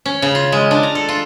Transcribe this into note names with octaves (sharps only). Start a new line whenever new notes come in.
C#4
C#3
F4
G#3
D4
A#5
A4
F4